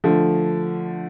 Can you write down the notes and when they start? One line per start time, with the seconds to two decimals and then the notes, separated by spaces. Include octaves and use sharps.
0.04 D3 F3 A3